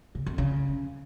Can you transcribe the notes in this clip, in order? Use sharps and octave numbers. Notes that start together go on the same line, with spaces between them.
C#3
F2
C#3